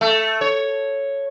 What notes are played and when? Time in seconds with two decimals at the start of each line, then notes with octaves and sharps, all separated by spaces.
0.01 A3
0.41 C#5